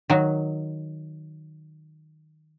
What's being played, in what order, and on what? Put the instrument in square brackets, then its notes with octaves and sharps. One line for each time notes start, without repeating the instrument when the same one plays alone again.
[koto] D#3 F#3